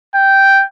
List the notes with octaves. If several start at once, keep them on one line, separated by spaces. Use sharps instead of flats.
G5